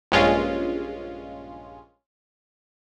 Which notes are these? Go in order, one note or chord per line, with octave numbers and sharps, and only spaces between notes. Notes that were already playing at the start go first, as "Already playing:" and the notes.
A#1 G2 G#3 C#4 F4